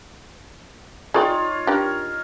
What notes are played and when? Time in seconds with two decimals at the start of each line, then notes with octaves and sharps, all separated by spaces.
1.14 D#4 F4 G#4 C#5 D5 G5
1.67 D4 G4 A#4